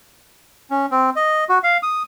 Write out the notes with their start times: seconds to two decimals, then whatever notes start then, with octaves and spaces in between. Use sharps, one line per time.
0.70 C#4
0.91 C4
1.16 D#5
1.49 F#4
1.63 F5
1.83 D#6